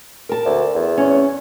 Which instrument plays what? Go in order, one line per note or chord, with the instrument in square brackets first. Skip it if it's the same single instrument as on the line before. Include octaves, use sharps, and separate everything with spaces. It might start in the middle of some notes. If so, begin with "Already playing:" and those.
[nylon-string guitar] A#4 A5
[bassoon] D2
E2
[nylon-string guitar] C#4